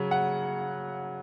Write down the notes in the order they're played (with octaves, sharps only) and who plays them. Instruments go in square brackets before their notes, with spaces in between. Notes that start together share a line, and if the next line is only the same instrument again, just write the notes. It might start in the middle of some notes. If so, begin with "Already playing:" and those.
Already playing: [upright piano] C#3 F#3
F#5